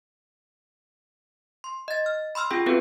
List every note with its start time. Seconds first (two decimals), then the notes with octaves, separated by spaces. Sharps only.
1.64 C6
1.88 D#5 A6
2.06 F6
2.35 B5 C6 E6 F6
2.51 C#4 F4 G#4 G5
2.66 B3 C4 F4 F#4 A4 B4